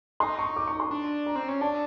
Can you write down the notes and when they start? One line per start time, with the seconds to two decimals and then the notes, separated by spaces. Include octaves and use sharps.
0.20 D#4 C6
0.39 C#6
0.56 D6
0.68 C#6
0.80 C6
0.91 D4
1.26 A#5
1.36 C4
1.48 C#4
1.61 D4 A5